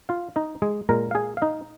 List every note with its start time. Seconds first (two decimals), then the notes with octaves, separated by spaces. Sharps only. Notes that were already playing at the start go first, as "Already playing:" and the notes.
0.09 F4 F5
0.36 D#4 D#5
0.62 G#3 G#4
0.89 A#2 G#3 A#4 A#5
1.11 F5
1.15 G#4 G#5
1.37 F5
1.42 D#4 D#5